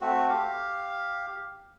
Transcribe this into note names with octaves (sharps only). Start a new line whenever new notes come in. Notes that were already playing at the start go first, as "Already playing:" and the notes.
A3 C4 F#4
G4 F5